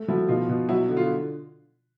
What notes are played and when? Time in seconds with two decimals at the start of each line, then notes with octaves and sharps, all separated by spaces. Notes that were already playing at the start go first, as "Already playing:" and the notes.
Already playing: A3
0.08 F3 E4 F#4
0.29 B2 D#4 F4
0.49 B2
0.68 F#3 E4 F#4
0.88 D3
0.97 F4